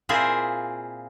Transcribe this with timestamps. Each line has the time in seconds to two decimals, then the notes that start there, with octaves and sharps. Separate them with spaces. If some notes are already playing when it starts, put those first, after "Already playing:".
0.09 A#2 C4 E4 F4 G#4 G#5